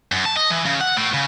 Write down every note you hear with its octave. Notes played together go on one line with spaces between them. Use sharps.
F#2
A5
D#5
E3
C#3
F#5
A2
C#3